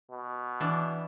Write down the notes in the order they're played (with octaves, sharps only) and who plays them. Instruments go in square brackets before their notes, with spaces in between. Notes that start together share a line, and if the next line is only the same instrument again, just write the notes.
[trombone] B2
[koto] E3 D4